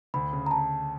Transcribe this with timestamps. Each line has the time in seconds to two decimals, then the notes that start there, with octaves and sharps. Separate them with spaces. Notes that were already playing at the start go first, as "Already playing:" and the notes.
0.14 D2 B5
0.33 C#3
0.46 A#5
0.51 A5